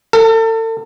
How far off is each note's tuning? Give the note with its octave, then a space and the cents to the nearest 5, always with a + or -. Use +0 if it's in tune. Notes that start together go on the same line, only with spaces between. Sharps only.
A4 +35